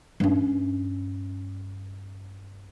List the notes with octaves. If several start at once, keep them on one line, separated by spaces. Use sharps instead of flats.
G2 C#4